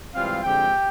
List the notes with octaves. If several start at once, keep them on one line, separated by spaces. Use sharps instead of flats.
G#2 E3 G3 C4 F4 F5
D3 F3 G#3 C4 G4 G5